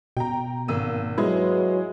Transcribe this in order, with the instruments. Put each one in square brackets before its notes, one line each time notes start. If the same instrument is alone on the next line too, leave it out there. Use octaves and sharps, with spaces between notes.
[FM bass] B2 [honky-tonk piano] G5 A#5
[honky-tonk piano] G#1 E6 D#7 [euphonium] A#3
[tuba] F#3 [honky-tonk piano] G#3 G#4 [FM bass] E4 [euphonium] B4